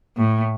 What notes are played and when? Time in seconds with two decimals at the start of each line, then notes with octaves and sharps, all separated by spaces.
0.18 A2